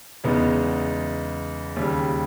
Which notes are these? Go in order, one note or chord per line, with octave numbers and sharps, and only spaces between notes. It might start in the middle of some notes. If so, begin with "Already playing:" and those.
E2 C#3 G#3 B3 D#4
D#2 C#3 G3